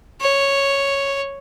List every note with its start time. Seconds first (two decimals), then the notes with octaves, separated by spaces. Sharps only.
0.21 C#5